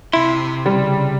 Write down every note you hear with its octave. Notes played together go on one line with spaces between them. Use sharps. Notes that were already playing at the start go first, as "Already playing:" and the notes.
C3 E4 C6
C#3 G3